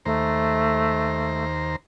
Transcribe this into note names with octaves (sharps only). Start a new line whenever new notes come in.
D#2 A3 C5 A#5